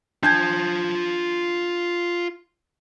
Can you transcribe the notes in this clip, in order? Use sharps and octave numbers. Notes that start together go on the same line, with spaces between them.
D4 F4 A5 G6 G#6